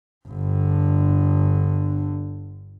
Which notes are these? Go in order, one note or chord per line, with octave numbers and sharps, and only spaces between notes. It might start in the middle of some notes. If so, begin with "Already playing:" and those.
G1 D3